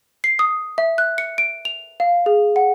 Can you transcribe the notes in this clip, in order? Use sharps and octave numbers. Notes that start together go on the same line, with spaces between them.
C7
D#6
E5
F#6
C#7
D7
F7
F5
G#4
F#5